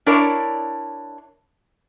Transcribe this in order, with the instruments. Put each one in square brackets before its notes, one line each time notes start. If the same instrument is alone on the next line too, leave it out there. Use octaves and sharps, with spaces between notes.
[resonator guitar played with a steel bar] D4 E4 A#4 C#5 D5 A5